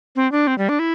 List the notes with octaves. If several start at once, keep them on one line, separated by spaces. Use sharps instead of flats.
C4
D4
C4
G3
D4
E4